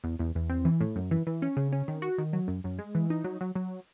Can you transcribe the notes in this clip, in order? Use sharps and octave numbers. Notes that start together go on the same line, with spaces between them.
E2
E2
E2
C4
E3
A2
F#2
E3
E3
C#4
C#3
C#4
D#3
F#4
D#3
F#3
F#2
F#2
G#3
E3
D#4
F#3
F#3
F#3